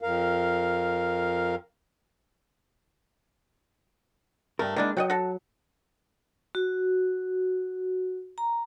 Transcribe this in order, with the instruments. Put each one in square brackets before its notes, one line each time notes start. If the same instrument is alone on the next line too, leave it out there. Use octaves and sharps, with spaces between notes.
[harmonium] F2 A#4 F5
[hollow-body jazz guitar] G2 A#4 [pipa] A3
[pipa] D#3 D4 E4 [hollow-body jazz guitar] G#3 A#3
[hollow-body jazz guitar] F#3 [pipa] D#5 F#5 G5
[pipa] F#4 A4
[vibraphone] F#4
A#5